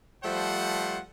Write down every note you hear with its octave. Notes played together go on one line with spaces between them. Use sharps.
F3 G3 A3 C5 F#5